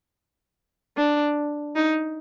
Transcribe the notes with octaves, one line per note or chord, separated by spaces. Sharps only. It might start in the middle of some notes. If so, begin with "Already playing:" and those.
D4
D#4